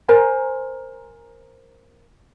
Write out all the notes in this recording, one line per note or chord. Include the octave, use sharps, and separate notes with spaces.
A#4 C5 G#5